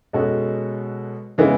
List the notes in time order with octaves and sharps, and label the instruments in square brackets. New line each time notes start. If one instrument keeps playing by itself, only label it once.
[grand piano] B2 G#3 C#4 F#4 A4
C#3 E3 G#3 B3 E4